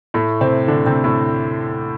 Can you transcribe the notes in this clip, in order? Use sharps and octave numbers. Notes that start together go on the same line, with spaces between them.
A2 A3
C3 C4
D3 D4
C3 C4
A2 A3